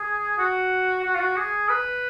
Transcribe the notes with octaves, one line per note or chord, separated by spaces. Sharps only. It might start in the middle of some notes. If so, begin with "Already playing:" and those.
Already playing: G#4
F#4
F#4
F4
F#4
G#4
B4